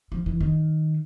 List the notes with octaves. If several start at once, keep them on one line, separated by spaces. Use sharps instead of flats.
F3
E3
D#3